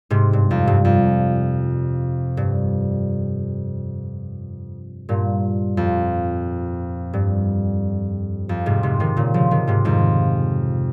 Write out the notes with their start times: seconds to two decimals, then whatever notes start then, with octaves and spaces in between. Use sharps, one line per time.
0.10 G#2 C3
0.33 G2
0.51 F2
0.68 G2
0.85 F2
2.37 G2
5.09 G2 A#2
5.77 F2
7.13 G2
8.49 F2
8.66 G#2 C3
8.83 G#2 C3
9.00 C3 D#3
9.17 A#2 C#3
9.34 C#3 F3
9.51 C3 D#3
9.67 G#2 C3
9.85 F2 G#2